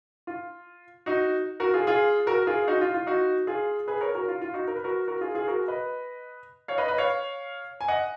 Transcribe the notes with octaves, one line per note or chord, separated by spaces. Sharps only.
F4
D#4 F#4
F#4 A#4
F4 G#4
F4 G#4
F#4 A#4
F4 G#4
D#4 F#4
F4
F4
D#4 F#4
F4 G#4
G#4 B4
A#4 C#5
F#4 A#4
F4
F4
D#4 F#4
A#4
B4
F#4 A#4
F#4 A#4
F4 G#4
F4 G#4
F#4 A#4
B4 D#5
C#5 F5
B4 D#5
B4 D#5
C#5 F5
G#5
D#5 F#5